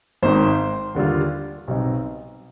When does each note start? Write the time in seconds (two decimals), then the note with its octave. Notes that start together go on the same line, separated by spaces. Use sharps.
0.22 G#1 G#2 D#3 C5
0.95 D#2 D3 G3 D4 F4
1.68 B1 B2 G3 C4 D#4